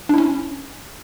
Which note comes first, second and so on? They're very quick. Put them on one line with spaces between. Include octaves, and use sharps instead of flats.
D4 E4 C#4